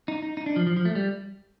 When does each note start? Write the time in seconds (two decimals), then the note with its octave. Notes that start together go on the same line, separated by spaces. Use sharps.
0.08 D#4
0.22 D#4
0.37 D#4
0.46 D4
0.56 F3
0.67 F3
0.77 F3
0.85 A3
0.95 G3